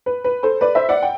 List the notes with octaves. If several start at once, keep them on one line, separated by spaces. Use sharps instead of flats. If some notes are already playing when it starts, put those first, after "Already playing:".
B4
B4
A4 C5
B4 D5
C5 E5
D5 F#5
G5